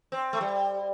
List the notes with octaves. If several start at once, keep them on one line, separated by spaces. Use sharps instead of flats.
C4
A3
G3